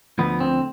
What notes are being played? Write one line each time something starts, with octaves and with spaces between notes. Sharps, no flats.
D2 D3 F3 B3
C4